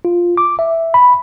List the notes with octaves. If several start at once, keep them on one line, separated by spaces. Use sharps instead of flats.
F4
D6
E5
B5